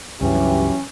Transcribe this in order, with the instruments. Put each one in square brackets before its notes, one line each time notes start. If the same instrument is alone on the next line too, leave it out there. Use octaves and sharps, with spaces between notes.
[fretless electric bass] C#2 G2 [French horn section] E3 F#3 G4 [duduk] C#4